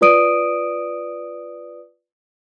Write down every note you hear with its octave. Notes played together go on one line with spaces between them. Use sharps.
F4 B4 D5 D#6 D7 D#7